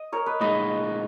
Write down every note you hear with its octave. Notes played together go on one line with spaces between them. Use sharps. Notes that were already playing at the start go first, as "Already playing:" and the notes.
Already playing: D#5
A#4 C#5
B4 D#5
A#2 G#3 D#4 B4 D#5